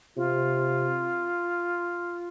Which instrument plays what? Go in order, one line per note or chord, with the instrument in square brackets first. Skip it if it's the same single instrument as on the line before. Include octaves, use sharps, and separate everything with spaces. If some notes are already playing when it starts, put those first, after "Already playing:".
[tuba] C3 [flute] F4